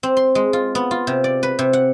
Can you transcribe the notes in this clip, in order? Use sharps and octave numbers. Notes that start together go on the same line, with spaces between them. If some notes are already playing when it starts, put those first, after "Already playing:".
C4
C6
G#3
F4
B3
F4
C3
D5
B4
C3
F#5